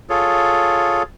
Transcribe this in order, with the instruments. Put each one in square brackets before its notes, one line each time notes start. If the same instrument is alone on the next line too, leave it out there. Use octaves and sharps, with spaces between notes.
[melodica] F4 G#4 A4 C#5